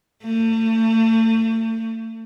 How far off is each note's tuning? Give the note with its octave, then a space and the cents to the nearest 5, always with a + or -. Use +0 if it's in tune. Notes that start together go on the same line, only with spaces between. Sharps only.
A3 +35